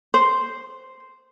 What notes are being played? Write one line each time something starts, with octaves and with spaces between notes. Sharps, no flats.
C5